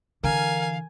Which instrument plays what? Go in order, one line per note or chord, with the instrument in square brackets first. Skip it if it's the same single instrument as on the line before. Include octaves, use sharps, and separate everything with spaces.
[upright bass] D3 E3 [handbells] A#4 A#5 F6 [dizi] F5 [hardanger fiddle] G#5